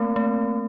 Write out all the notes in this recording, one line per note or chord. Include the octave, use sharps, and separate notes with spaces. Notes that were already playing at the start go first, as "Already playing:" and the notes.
Already playing: A3 A#3 C4
A3